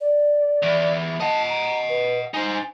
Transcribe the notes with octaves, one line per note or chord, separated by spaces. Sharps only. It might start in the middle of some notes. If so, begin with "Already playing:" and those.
D5
E2 E3
D#5 F#5 A5
A#5
B4
D#4 C5 G#5